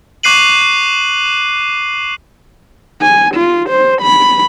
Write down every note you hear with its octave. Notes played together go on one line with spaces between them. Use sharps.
C#6 D6 F#6 C7 D#7 F#7
G#5
F4
C5
B5